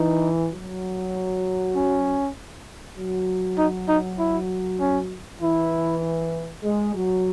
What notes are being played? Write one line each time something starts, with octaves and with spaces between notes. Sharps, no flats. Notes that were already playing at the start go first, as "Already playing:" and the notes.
Already playing: E3 D#4
F#3
C#4
F#3
D#4
D#4
E4
C#4
E3 E4
G#3
F#3